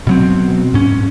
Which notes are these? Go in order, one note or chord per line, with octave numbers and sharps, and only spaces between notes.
B2 F#3 C4
G#2 C#4